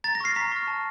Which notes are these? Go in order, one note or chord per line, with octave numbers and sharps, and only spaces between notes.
A#5 A6
A#6
C#6 F6 C7
A#5 B6
C#6 F6
A5